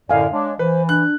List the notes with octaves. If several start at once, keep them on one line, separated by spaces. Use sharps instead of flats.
F#2 A2 D3 D5 D#5 F5 G#5
G#3 D4 C#5
E3 B4 C5
D4 F#6